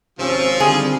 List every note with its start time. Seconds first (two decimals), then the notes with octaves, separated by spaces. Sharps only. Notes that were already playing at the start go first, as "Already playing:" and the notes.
0.19 G#1 C3 F3 C#4 F4 C5 E6
0.60 D3 D#3 G3 C4 G#4